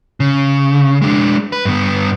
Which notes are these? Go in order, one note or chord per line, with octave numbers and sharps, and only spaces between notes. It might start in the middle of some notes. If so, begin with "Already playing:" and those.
C#3
G#3 D4
B4
G2 B3